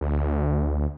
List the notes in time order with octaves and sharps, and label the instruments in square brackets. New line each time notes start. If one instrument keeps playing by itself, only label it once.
[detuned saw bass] D2